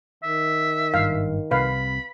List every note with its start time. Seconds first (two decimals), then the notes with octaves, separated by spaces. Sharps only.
0.23 D#3 E5
0.94 G#1 G2 F5
1.51 C2 C3 B4 F5 B5